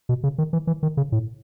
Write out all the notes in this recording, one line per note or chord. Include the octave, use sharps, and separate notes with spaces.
B2
C#3
D#3
E3
E3
D#3
C#3
A2